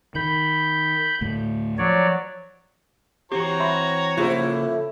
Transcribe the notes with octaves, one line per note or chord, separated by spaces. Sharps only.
D#3 B5 G6
D2 A2 A3
F3 F#3 C#5 D5
E3 C4 F#4 G4 C#5 A#5
E5 B5 C6
A2 C#3 F3 A#3 E4 F4 G#4 C5